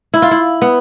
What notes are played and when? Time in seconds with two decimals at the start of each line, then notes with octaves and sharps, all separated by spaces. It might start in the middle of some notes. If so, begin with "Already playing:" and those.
0.14 E4
0.22 F4
0.31 E4
0.62 B3